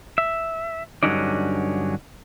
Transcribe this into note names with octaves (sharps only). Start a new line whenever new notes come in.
E5
G2 D3 F#3 C#4 D#4 D5